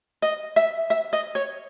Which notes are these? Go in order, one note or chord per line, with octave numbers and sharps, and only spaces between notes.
D#5
E5
E5
D#5
C#5